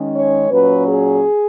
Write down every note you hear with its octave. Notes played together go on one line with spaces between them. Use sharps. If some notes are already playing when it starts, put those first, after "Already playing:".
Already playing: D#3 G#3 C#4
C#5
A#2 F#3 C#4 B4
G#4